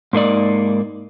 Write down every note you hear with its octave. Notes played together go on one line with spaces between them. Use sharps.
G#2 A#3 D#4 D5